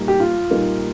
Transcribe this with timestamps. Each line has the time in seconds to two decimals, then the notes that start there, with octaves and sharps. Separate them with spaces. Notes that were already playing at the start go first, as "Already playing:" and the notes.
Already playing: A#2 G3 A#3 D#4
0.08 G4
0.20 F4
0.50 A#2 G3 A#3 D#4